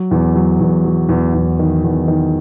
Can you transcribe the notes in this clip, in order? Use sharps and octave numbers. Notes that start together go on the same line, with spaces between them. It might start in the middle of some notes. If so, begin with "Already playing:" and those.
Already playing: F#3
E2
F#3
E2
F#3
E2
E2
D#3
E2
D#3